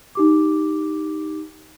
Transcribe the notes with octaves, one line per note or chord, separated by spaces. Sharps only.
D#4 G4 D6